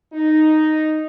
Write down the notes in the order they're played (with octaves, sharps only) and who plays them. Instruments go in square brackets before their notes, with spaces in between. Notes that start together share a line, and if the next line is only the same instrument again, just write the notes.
[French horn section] D#4